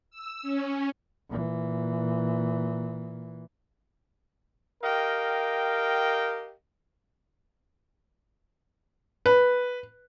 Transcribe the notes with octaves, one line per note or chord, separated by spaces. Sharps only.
E6
C#4
A#2 E3
G4 A#4 D#5 F5 G5
B4